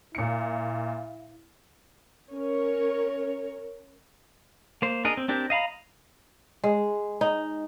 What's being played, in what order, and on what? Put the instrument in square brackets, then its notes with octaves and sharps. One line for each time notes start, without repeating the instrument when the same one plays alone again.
[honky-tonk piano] A#2 C#7 [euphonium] E4
[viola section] C#4 A#4 C#5
[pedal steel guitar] A#3 C5
D4 G#4 A#4 D#5
C4
C4 D4 G4 A#4
D#5 F5 A#5 B5
[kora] G#3
D#4